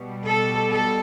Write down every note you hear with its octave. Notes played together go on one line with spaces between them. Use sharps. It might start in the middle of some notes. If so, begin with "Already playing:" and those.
Already playing: B2 G3
A4
A4